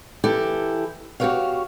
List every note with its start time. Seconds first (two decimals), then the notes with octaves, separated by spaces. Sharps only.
0.24 E3 E4 G4 A4
1.20 F#4 G4 A4 B4 C#5 F5